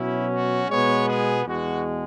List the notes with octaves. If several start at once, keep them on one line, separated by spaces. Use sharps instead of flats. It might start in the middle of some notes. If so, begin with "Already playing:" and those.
Already playing: B2 F#3 C#4 E4
F#4
B2 G#3 B3 C#5
G#4
E2 B2 G#3 F#4